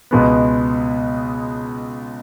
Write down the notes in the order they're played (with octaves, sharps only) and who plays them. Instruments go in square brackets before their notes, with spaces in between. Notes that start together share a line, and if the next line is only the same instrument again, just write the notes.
[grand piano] C#2 B2 G#3 B3